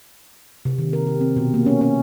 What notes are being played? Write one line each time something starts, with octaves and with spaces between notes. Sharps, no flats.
C3
D#3
A#4
G4
C4
B2
A#3
C#4
C#4